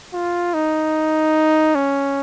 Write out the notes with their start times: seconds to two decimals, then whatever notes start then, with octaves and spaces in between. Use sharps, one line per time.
0.13 F4
0.54 D#4
1.75 C#4